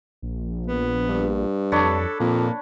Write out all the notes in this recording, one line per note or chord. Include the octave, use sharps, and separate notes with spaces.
A#1
B3
G2
F2 D4 A4 C#5 B5
F2 A#2 A#3